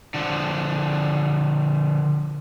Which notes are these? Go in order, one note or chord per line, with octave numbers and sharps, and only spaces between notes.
D3 F3